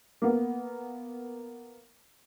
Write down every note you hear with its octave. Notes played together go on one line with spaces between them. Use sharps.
A#3 B3